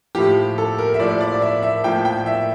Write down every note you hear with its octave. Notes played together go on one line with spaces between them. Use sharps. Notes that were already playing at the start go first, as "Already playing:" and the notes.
A2 F3 G4
A4
A#4
E5
A2 F3 D5
D5
D5
E5
E5
A2 F3 G5
G5
E5